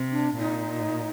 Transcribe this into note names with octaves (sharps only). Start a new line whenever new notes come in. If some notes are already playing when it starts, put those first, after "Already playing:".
Already playing: C3
D4
A#2 D#4